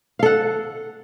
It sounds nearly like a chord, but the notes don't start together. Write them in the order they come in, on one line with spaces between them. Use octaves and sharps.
F5 A4 F#5